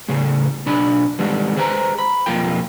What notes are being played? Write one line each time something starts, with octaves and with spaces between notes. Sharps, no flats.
A2 C#3 G#4
B1 D4 B5
D#3 G3 G#3 B3
G#4 B4 C5 F#5 A#5
B5
B1 F2 A#3 F4 G5